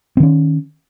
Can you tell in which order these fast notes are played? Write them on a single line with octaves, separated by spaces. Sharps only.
C4 D#3 C#4